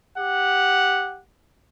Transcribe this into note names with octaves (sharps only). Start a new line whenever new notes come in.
G4 F#5